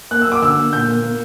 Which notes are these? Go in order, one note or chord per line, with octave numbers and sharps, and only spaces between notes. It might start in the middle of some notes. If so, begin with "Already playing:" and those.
A#3 F#6
E6
F#3
D6
D3 E6
A#3
A#2 G6
A#3
A#3